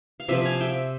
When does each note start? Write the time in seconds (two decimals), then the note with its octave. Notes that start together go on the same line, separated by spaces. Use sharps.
0.20 F5
0.28 C3 F3 C4 E5 G5
0.45 F5 G#5
0.60 E5 G5